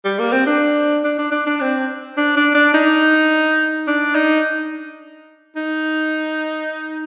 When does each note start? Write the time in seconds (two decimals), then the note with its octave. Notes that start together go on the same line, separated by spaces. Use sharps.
0.05 G3
0.19 A#3
0.33 C4
0.47 D4
1.04 D4
1.19 D4
1.32 D4
1.47 D4
1.61 C4
2.17 D4
2.37 D4
2.55 D4
2.74 D#4
3.87 D4
4.15 D#4
5.56 D#4